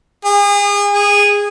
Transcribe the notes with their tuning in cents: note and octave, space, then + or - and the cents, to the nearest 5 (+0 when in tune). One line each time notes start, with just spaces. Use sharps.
G#4 -35
G#4 -15